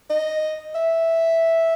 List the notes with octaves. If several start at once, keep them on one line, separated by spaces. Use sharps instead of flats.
D#5
E5